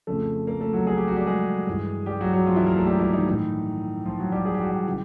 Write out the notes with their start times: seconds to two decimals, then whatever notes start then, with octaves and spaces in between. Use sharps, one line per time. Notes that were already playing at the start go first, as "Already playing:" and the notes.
0.07 F2 C#3 F3 A3 A4
0.47 A#3 A#4
0.60 A3 A4
0.73 F#3 F#4
0.87 G#4
0.98 G4
1.08 F#4
1.16 G3 G4
1.26 G#3 G#4
1.67 G2 E3
2.06 G3 G4
2.21 F#3 F#4
2.33 F#3 F#4
2.46 F3 F4
2.56 E3 E4
2.66 A#3 A#4
2.76 A3 A4
2.87 G3 G4
2.99 E3 E4
3.13 D#3 D#4
3.26 A2 E3
4.06 F3 F4
4.19 F#3 F#4
4.32 G3 G4
4.45 G#4
4.54 G4
4.61 F#4
4.69 G3 G4
4.86 C#3 E3